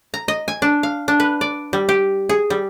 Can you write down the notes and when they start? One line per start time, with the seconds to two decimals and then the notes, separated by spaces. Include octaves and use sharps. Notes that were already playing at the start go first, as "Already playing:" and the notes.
0.14 A#5
0.28 D#5
0.48 G#5
0.62 D4
0.83 F5
1.08 D4
1.20 B4
1.41 D5
1.73 G3
1.89 G4
2.29 G#4
2.50 G3